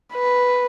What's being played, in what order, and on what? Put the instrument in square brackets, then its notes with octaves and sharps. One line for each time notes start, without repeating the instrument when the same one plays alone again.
[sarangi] B4